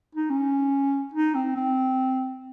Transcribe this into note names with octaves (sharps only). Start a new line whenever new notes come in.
D#4
C#4
D#4
C4
C4